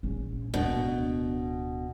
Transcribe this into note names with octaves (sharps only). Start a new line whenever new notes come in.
A#1 C#4
D1 B2 D4